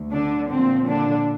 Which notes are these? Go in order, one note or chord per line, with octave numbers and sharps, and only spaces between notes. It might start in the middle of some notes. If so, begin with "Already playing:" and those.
Already playing: D2
D3 D4
A#2 F3 C4
D3 D4